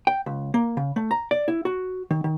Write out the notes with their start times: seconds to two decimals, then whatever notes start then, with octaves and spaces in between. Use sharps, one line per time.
0.07 G5
0.26 C#2
0.54 A#3
0.77 C#3
0.96 A3
1.11 A#5
1.31 D5
1.48 E4
1.65 F#4
2.11 D#3
2.24 D#3